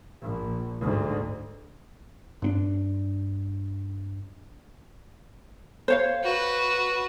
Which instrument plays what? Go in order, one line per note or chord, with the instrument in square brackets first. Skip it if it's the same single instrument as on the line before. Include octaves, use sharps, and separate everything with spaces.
[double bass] A#1
D2 G#2
[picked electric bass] G2 C4 D4
[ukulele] C5 C#5 F5
[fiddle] F#4 B4